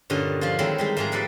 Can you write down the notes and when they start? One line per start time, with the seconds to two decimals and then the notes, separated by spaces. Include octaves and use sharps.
0.10 G2 A#2 D3 C#4 D#5
0.41 F3 D4 F4
0.59 D#3 F#3 G#3 A3 C4 E4
0.78 G3 G#3 D#4
0.97 G#2 F3 G#3 A3 G#4 A#5
1.12 G3 A#3 A4 B4 D5